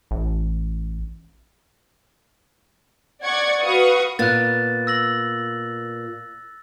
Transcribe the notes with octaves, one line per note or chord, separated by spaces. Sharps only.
A1
D5 F#5 C#6 G#6
F#4 B4 F5 C#6 D#6
A#2 B3 F#6 A6
E6 A#6 F#7